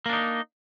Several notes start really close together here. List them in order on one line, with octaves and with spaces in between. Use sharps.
A#3 D4 D#4